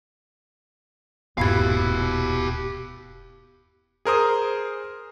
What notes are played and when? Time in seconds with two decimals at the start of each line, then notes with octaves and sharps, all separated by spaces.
1.38 D#1 G2 B2 E4 G4 F5 B5 G#6
4.05 G#4 A#4 C5 D#6